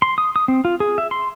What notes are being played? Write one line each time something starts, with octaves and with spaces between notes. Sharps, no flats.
C6
D#6
D#6
C4
F4
G#4
E5
C6